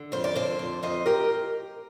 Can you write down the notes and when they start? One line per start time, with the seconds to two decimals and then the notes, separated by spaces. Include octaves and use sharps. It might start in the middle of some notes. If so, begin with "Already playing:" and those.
Already playing: D3
0.12 F2 C5
0.24 D5
0.35 D3 A4 C5
0.59 F2
0.83 F2 C5 D#5
1.06 G4 A#4